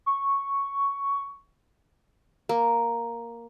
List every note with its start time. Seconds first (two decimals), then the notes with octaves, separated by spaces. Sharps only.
0.06 C#6
2.49 A#3